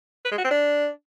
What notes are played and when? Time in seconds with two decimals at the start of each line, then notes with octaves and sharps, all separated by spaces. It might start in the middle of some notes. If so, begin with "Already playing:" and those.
0.25 B4
0.31 G#3
0.38 F#4
0.44 C4
0.51 D4